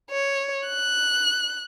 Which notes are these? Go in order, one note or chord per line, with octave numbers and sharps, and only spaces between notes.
C#5
F#6